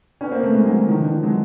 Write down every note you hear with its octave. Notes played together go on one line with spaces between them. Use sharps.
B3 C#4
A#3 C4
A3 B3
G#3 A#3
F#3 G#3
E3 F#3
D#3 F3
D3 E3
D#3 F3
F#3 G#3